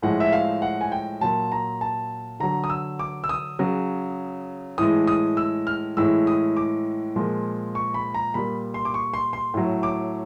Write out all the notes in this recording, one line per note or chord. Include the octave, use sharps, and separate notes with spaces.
A2 F3 G#3 F#5
E5
F5
F#5
G#5
G5
A#2 F#3 A5
A#5
A5
D3 F#3 A#5
D#6
E6
D6
E6
D#6
C#3 F#3
A2 E3 G#3 D#6
D#6
E6
F6
A2 E3 G#3 E6
D#6
D6
A#2 F3 G#3
C#6
B5
A#5
A#2 G3 B5
C6
D6
C#6
C6
C6
A2 F#3
D6